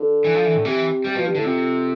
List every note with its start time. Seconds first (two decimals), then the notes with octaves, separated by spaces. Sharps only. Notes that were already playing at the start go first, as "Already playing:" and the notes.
Already playing: D3
0.24 E3
0.34 F3
0.45 E3
0.55 A2
0.65 C3 E3
1.04 C3 G3
1.15 B2 F3
1.25 G2
1.35 A2 D3
1.44 F2 C3